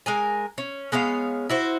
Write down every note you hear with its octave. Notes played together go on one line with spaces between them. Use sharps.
G#3 A#4 G#5
C#4
G#3 B3 C#4 F5
E4 F#4 C5